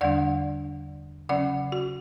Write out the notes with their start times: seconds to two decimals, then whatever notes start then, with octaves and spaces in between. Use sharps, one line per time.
0.01 E2 D3 G3 D4 D5 F#5
1.29 C#3 F#3 C#4 D5 F#5
1.72 F#4